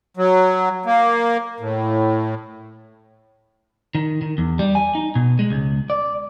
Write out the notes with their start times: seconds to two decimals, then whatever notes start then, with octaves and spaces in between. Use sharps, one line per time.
0.17 F#3
0.86 A#3
1.60 A2
3.95 D#3
4.22 D#3
4.38 E2
4.59 G3
4.75 G#5
4.95 D#4
5.15 B2
5.39 G#3
5.50 C#2
5.90 D5